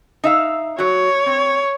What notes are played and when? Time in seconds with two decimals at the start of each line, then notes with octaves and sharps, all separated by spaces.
0.24 D#4 E5 F5
0.78 F#3 F#4 C#5
1.26 C4